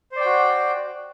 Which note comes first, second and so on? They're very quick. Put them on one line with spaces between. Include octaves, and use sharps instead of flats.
C5 D5 G5 F#4